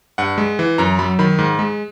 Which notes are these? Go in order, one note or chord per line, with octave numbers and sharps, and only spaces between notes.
G2 F#5
G#3
E3
F#2 A#5
F#3 B5
D#3 B5
G#2
G#3